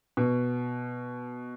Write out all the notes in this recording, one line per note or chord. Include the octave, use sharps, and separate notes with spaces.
B2